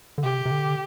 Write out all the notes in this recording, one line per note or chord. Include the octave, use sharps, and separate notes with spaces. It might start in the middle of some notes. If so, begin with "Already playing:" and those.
D3
C3 G4
C3
D3